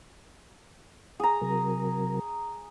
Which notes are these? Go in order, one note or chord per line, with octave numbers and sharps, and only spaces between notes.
G#4 A#5
C3 F#3 A#4